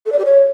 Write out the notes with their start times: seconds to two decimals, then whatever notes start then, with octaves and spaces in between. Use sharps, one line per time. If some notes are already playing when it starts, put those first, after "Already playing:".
0.06 A4
0.12 D5
0.19 G4
0.25 C#5